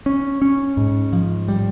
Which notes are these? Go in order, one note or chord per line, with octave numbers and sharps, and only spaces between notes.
C#4
C#4
G#2
F3
G3